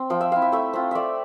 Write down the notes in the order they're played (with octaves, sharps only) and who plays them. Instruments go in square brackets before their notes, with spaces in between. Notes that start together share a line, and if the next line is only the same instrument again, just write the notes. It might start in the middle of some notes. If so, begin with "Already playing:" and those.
Already playing: [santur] C4
F3 G5
E5
C4 E4 F5
E5
A3 E5
C4 F4
A3 D5 E5